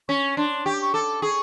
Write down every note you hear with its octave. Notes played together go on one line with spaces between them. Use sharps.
C#4 C#6
D4 C6
G4 C#6
D6
C#6
A4 D6
G#4 C#6